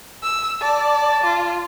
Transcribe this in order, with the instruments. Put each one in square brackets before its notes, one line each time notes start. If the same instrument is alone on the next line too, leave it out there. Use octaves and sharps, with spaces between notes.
[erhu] E6
[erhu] D5 [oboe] A5
[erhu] F4